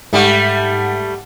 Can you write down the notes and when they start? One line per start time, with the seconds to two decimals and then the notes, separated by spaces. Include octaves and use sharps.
0.13 G#2 G3 A3 F#5